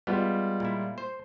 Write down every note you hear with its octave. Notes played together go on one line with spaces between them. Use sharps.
G3 G#3 B3 F4
A#2 E4
C5